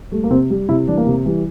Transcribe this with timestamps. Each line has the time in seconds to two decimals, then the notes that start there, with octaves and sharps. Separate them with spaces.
0.12 G3 A3
0.24 A#3
0.30 C3 C4
0.50 G3
0.69 C3 E4
0.88 E3 G3 D4
0.97 A#3
1.07 C3
1.25 E3 G3